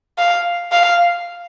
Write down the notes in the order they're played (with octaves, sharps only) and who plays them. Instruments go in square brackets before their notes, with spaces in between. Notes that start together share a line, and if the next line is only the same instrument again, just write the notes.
[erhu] F5
F5